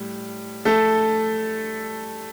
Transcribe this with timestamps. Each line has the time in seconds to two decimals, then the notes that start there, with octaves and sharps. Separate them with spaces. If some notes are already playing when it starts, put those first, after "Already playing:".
Already playing: A2 G3
0.65 A3 A4